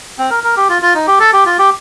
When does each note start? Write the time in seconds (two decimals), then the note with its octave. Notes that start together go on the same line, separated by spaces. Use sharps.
0.19 C4
0.31 A#4
0.44 A#4
0.57 G4
0.69 F4
0.82 F4
0.95 D#4
1.07 G4
1.20 A4
1.33 G4
1.46 F4
1.59 G4